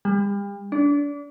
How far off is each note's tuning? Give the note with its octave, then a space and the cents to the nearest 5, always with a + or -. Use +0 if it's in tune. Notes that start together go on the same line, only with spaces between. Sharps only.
G3 +40
D4 -30